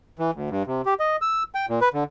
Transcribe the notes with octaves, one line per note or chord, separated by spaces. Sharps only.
E3
D2
G2
C3
G4
D#5
E6
G5
A#2
B4
D3